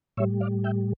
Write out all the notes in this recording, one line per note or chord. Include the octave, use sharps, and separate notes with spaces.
A2 G3 C#5 E5
D5 F5
E5 G5